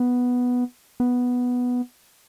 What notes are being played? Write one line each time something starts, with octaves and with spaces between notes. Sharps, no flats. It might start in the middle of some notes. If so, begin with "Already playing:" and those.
Already playing: B3
B3